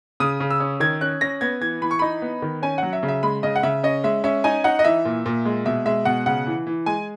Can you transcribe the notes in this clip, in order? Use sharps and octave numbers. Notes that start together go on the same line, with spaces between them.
C#3 D#6
C#3
E6
C#4
D#3 G#6
C#4 F#6
C#4 A#6
B3 G#6
E3 G#6
E3 B5
C#6
D#4 B5
B3
D#3
C#4 G#5
F#3 F#5
E5
C#3
E5
G#3 B5
C#3 D#5
F#5
C#3 E5
C#4 D#5
G#3 E5
C#4 E5
D#4 G#5
D#4 F#5
D#5
E3 E5
A#2
A#2
G#3
B2 E5
G#3 E5
B2 F#5
C#3 F#5
E3
E3
G#3 G#5